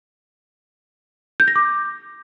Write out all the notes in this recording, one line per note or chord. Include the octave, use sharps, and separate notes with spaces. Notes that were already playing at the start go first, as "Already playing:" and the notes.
G6
A#6
D6